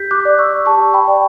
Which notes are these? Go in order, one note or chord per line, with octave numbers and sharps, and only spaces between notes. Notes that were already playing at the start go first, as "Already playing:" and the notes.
Already playing: G4 G6 B6
D6 F#6
D5
C#6 E6
G4 A5 C#6
G5 B5
D5